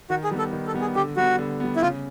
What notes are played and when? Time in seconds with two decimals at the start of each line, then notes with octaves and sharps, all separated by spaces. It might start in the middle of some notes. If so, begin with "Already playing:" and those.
0.10 D#3 F#4
0.24 G#4
0.31 G3 B3
0.39 A4
0.53 D#3
0.67 A4
0.74 G3 B3
0.81 G#4
0.95 D3 G4
1.17 G3 B3 F#4
1.39 D3
1.60 G3 B3
1.76 E4
1.81 C#3 F4